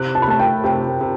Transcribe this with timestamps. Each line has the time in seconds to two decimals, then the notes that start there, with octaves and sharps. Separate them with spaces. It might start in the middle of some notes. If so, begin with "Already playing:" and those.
Already playing: C3 F#6
0.15 A5
0.22 B5
0.27 A3 A5
0.39 G5
0.64 C3 G5
1.01 C3